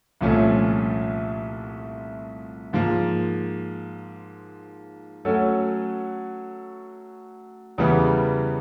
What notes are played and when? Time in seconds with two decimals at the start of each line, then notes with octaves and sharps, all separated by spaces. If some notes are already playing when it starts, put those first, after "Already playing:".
0.21 C2 A#2 F3 A3 C#4
2.73 G#2 F3 A#3
5.25 F#3 A3 C#4 F#4 A4
7.78 E2 C#3 E3 G3 B3